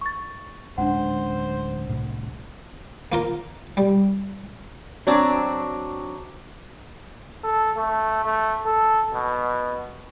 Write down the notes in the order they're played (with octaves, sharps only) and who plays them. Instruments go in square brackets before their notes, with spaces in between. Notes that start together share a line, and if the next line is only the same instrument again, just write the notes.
[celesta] C#6 A6
[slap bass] D1 G#3 C#4 [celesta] D4 F#5 [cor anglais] C5
[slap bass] C2 A2
[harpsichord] A#3 F4 A#4
G3
[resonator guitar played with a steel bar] F#3 C4 D4
[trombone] A4
A3
A3
A4
B2